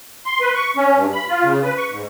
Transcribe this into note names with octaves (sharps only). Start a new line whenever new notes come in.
C6
B4
C#6
C#4
G2
B5
F4
C#3
B4
C#6
G#2